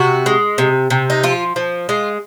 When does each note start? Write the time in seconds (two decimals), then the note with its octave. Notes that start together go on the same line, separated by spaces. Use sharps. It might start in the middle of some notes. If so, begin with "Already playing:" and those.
Already playing: C3 F#4
0.26 G#3
0.58 C3
0.90 C3
1.10 D#4
1.23 F3 F4
1.56 F3
1.89 G#3 F4